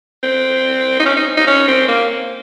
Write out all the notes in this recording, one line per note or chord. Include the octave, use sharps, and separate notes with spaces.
C4
D#4
C#4
D#4
D#4
C#4
C4
A#3